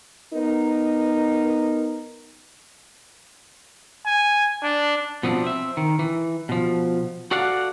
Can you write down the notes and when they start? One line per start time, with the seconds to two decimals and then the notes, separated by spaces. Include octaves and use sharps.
0.34 B3 D#4 A#4
4.06 G#5
4.63 D4
5.23 B2 F3 B3 C4 D4
5.44 C4 E5
5.77 D#3
5.99 E3
6.49 B2 F3
7.31 F#4 A4 D5 F5 F#5